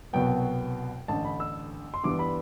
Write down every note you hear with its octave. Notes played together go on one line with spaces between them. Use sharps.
C2 B2 F#3 B3 G5
A1 G2 D3 A5
B5
E6
C6
G2 E3 G3 B3 D6
B5